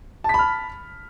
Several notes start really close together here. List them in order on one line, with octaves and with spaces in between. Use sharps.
A5 B6 B5 F6